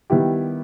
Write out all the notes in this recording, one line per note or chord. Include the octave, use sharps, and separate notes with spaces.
D#3 G3 B3 E4 G4